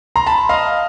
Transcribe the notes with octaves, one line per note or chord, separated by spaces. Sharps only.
A#5 C6
A5 B5
D#5 F5